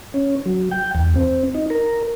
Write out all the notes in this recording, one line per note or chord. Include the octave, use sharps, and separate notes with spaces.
C#4
F#3
G5
E2
C4
D#4
A#4